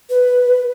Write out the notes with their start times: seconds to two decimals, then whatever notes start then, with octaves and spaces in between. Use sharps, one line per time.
0.10 B4